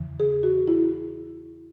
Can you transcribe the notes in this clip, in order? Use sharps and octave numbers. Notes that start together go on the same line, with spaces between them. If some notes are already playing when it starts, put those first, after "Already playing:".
Already playing: E2 C#3 E3
G#4
F#4
E4